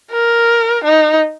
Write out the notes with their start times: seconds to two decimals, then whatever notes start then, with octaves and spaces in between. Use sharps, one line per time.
0.11 A#4
0.84 D#4